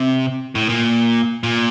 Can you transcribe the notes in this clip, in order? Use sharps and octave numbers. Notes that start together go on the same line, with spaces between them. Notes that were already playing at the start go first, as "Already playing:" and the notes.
Already playing: C3
A2
A#2
A#2